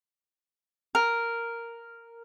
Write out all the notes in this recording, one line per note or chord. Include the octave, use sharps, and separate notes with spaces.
A#4